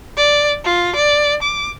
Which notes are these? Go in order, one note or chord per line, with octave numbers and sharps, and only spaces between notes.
D5
F4
D5
D6